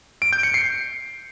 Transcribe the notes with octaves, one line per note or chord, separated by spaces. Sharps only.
D7
G6
C#7
C7